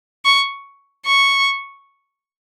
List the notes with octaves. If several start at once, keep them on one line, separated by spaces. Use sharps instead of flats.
C#6
C#6